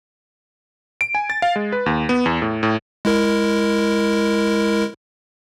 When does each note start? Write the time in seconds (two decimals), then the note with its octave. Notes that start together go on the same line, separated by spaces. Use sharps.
1.01 D7
1.15 G#5
1.30 A6
1.42 F5
1.56 G#3
1.72 B4
1.86 D#2
2.09 B3
2.26 E2
2.42 A2
2.63 A2
3.05 G#3 E4 A#4